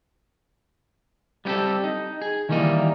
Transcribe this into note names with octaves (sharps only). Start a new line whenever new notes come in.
G3 B3 C4 G4 A4
D#4
G#4
D#3 E3 G3 A#3 D#4